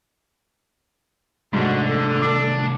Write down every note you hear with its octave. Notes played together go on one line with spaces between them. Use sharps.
C2 G#2 D3 A3 F#4
A4
D4 D6